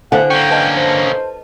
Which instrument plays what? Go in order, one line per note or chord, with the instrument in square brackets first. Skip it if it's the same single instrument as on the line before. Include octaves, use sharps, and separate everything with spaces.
[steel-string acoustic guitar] D3 [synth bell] C5 F5 G#5 [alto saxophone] F#5
[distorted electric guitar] A#3 C#4 [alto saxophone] G5
[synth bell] B4 D#5 A5
[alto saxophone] C5